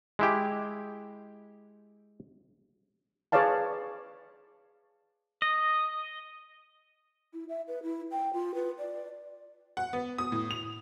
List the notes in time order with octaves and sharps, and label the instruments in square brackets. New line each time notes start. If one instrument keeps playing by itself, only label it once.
[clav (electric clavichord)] G#3 E4 G4
[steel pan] G#4 B4 C#5 D5 F5 A5
[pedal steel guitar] D#5
[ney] E4
E5
B4
E4
G5
F4
B4
D5
[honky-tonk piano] F#5
B3
D#6
A2
F7